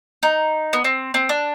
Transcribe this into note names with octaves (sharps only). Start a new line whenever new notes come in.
D#4
B3
C4
C4
D4